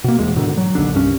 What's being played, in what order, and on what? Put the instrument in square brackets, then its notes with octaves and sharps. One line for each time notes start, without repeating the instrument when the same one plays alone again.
[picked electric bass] B2 A#3
D#1 E2 G#3
G#2 B2 D3 D#3
F#3
A#1 D#2 D3 D4
C2 G2 C#4